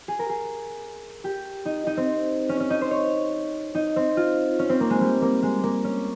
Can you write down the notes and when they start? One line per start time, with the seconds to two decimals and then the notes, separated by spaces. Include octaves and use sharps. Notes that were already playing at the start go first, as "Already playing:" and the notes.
0.08 G#4
0.19 A#4
0.29 G#4
1.24 G4
1.66 D#4
1.87 D#4
1.97 C4
2.49 C#4
2.60 C#4
2.70 D#4
2.81 C5
2.91 C#5
3.75 D#4
3.96 C4
4.17 F4
4.59 C#4
4.70 C4
4.80 A#3
4.90 G#3
5.01 G3
5.22 A#3
5.43 G#3
5.64 A#3
5.84 C#4